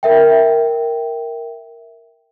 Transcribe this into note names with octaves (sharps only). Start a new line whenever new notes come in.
A#4 E5 G5